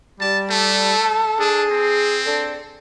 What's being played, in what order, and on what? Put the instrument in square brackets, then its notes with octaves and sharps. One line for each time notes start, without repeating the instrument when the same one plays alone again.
[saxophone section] G3 [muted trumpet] A5
[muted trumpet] A3 [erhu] A4
[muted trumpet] D4 [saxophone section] G#4
[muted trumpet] C4
[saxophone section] D4 A4